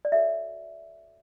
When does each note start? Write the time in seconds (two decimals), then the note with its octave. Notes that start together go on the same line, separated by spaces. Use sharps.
0.05 D5
0.12 F#4 A4 C#5 E5